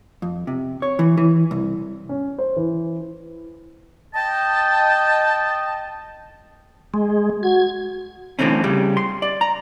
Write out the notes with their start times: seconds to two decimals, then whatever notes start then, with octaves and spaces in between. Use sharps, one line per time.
0.22 F2
0.47 C3
0.82 C#5
0.99 E3
1.18 E3
1.51 C2
2.09 C#4
2.38 C5
2.56 E3
4.14 D#5 G5 A5
6.94 G#3
7.43 F#4 G#6
8.39 C2 A2 D3 E3 C4 C#4
8.64 C#3 G3
8.97 C6
9.22 D5
9.41 A#5